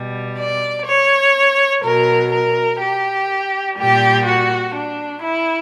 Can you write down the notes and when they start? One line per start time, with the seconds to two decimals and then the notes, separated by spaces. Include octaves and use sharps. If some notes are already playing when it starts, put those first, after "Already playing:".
Already playing: B2 G3
0.36 D5
0.86 C#5
1.82 B2 F#3 A#4
2.31 A#4
2.79 G4
3.77 A#2 G3 G4
4.26 F#4
4.75 D4
5.23 E4